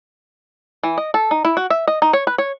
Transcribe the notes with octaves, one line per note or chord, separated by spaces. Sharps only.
E3
D#5
A4
D#4
E4
F#4
E5
D#5
D#4
C#5
B4
C#5